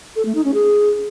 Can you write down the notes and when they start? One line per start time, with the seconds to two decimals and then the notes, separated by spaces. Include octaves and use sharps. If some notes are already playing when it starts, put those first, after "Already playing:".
0.16 A4
0.25 A3
0.35 D#4
0.45 C#4
0.54 G#4